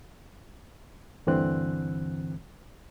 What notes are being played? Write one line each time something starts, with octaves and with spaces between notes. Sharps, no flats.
D2 G2 D3 E3 C4 F#6